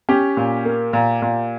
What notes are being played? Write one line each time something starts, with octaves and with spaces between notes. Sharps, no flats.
C#4 G4
A#2
A#3
A#2
A#2